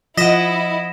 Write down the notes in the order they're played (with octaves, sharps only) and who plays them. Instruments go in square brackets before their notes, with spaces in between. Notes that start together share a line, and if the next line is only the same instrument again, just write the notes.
[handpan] F3 F#5 [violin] E4 [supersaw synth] D#5 [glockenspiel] A#6 B6 E7